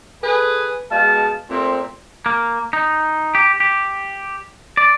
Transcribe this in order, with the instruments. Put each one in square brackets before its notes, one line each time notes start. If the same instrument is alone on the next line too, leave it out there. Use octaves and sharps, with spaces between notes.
[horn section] G#4 A4 B4
B2 G#3 G#4 F5 A5
A#2 A3 C4
[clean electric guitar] A#3
D#4
G4
G4
D5